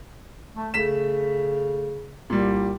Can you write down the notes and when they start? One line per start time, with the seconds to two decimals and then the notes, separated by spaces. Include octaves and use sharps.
0.56 A3
0.74 C#3 A3 B6 E7
2.30 C2 A#2 G3